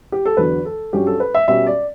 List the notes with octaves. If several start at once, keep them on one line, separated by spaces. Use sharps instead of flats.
G4
A4
E2 D3 F#3 B3 B4
A4
G2 F#3 C#4 G4
A4
B4
E5
B2 G3 C#4 E5
D5